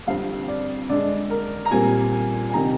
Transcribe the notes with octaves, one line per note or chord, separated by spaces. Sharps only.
F2 D3 G3 C4 F5
D5
D3 G#3 D4 D5
A#4
A#5
A#2 G3 C4 G#5
G#5
C3 D#3 G3 A#5